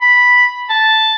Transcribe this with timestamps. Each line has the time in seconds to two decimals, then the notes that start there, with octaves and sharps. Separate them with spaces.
0.02 B5
0.69 A5